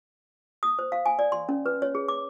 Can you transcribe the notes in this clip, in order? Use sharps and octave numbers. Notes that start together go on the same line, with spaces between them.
D#6
C5
F5
G#5
D5
C6
C#4
B4
C#5
G#4
D6